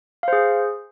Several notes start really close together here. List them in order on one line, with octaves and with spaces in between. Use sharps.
F5 C5 G#4